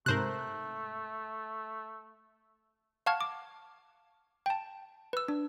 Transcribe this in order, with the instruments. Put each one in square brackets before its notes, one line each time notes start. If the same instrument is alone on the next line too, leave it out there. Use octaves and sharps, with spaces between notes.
[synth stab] G#2 C3 [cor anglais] A3 [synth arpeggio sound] A#4 C5 F#6
[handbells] F5 F#5 A5 C#6 F6 G#6
D6
G5 A5
B4 E6
D4